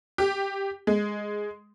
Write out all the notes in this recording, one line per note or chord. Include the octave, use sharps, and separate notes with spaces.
G4
G#3